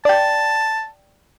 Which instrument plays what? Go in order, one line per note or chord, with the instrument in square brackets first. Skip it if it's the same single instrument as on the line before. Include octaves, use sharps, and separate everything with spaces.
[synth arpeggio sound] D5 G5 [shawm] A5